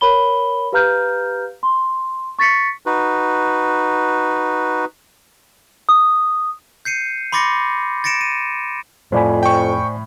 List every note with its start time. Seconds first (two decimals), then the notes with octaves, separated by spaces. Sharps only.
0.01 A#4 C#5 B5 G7
0.72 G4 B4 F5 A#5 F6 G6
1.63 C6
2.39 C#6 A6 B6 C#7
2.86 D#4 F#4 B4
5.89 D#6
6.85 G6 C7 C#7 D#7
7.32 B5 C6 D6 A6 A#6 C#7
8.04 A6 A#6 C#7 D7 E7
8.21 D#7
9.12 F2 A2 C5 D5 G#5 B5
9.43 G5 C#6